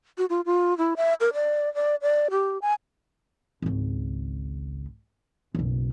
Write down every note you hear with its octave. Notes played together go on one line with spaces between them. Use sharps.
F#4
F4
F4
E4
E5
A#4
D5
D5
D5
G4
G#5
G#1 C#2
F#1 B1